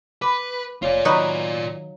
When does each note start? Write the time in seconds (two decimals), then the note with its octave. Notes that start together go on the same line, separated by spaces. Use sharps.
0.22 B4 B5 D6
0.82 F1 F4 C#5 D5 F5
1.05 D#3 F#3 D#4 B4